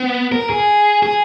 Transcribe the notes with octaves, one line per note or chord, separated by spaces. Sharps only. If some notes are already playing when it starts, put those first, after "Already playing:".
Already playing: B3
A#4
G#4
G#4